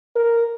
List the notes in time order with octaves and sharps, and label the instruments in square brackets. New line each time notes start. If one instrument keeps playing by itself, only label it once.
[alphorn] A#4